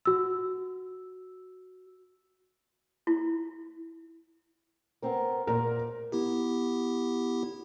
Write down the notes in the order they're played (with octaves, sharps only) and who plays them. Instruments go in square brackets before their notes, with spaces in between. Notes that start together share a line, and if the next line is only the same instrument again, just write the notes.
[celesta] F#4 E6
[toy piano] E4
[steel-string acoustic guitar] B3 C4 A#4
[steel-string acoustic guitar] A#2 [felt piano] A#4
[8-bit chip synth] B3 E4 G4